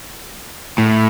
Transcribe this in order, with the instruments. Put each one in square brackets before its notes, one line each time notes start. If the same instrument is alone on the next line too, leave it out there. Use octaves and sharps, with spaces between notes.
[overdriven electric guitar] A2